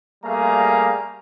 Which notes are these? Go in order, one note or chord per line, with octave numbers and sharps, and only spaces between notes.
G3 A3 A#3 G#4 F5 A#5